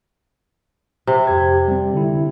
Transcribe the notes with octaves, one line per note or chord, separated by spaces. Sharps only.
C3
F2 G4 G#6
G3 C4
D3 E4